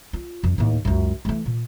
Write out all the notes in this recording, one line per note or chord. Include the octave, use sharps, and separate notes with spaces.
F4
F2
D#2 A2
C#2 F#2
E3 A3
A#2